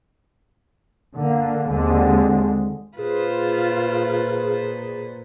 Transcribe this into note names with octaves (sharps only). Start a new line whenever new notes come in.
D3 A#3
D#2 D3 G#3 C4
A#2 F4 G#4 B4 C5